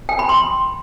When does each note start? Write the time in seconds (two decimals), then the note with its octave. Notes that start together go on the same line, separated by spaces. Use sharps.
0.09 G5
0.19 B5
0.29 C6